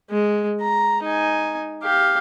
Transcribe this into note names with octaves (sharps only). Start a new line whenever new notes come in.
G#3
A#5
D#4 G#5
G4 F5